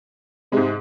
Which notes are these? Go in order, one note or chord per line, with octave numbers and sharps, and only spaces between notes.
G#2 C3 G#3